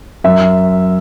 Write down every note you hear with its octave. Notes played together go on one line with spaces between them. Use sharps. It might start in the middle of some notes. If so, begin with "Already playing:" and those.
F#2 E5